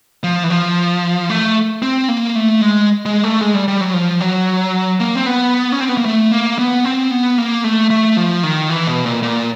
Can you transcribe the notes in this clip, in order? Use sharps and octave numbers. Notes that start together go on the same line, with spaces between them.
F3
E3
F3
A3
C4
A#3
A3
G#3
G#3
A3
G#3
G3
G3
F#3
F3
F#3
A#3
C4
B3
C#4
C4
B3
A#3
A3
A#3
B3
C4
B3
A#3
A3
A3
F3
D#3
E3
B2
A#2
A#2